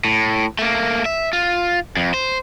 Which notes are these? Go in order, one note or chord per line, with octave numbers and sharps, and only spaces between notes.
A2
A3 A#3
E5
F4
F2
C5